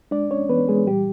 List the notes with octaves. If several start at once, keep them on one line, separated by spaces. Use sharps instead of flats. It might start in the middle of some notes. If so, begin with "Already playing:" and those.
G#3 D4 D5
C#4 C#5
E3 B3 B4
G#3 G#4
A#2 G3 G4